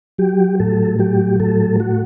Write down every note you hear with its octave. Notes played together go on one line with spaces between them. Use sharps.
F#3 G4
A2 A4
F#3 G4
A2 A4
F#4